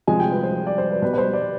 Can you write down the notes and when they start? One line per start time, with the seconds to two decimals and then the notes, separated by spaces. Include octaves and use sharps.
0.07 C3 F3 G#3 G#5
0.20 G5
0.32 B4
0.43 C5
0.67 D5
0.78 C5
0.91 B4
1.02 B2 G3 B4
1.13 B4
1.18 C5
1.34 D5